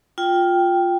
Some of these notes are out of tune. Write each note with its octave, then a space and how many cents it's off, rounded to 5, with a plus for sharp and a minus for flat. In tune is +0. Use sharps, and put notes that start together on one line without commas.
F4 +10 G5 +0